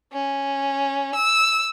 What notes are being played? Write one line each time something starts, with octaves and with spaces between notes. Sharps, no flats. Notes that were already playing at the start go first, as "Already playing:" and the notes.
C#4
E6